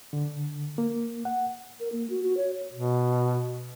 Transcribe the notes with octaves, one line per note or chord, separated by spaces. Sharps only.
D3
A#3
F#5
A#4
A#3
F#4
F#4
C#5
B2